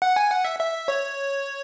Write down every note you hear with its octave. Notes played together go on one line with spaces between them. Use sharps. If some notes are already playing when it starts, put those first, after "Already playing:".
F#5
G#5
F#5
E5
E5
C#5